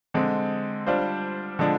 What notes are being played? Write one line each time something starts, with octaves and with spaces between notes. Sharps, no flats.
D3 G#3 C4
G3 D4 F4 C5
D3 F3 G#3 D4